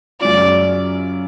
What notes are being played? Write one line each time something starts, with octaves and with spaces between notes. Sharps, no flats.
F#2 C#3 F#3 C#4 F4 D5